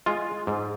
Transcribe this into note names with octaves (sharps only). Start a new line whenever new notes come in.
G#3 F4
G#2